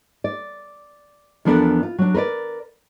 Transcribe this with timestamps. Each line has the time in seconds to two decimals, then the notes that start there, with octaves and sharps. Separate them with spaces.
0.24 D5
1.45 E2 F3 B3 D4 A4 A#4
1.83 F4
1.98 F#3 D4
2.14 A#4 B4 C#5 D5